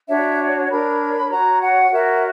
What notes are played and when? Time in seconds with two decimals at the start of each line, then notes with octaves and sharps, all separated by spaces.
0.08 D4 F#4 C#5 E5
0.70 D4 A#4 C#5 B5
1.31 F#4 C#5 A#5
1.61 F#5
1.92 F#4 A#4 C#5 E5